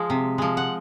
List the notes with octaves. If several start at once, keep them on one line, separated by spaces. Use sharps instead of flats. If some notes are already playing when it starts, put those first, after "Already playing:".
Already playing: F3 G#3
C3
F3 G#3
F#5